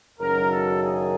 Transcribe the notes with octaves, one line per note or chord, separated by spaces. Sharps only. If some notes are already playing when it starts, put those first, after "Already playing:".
F#1 F#2 D#3 F#3 A#4
A4
G#4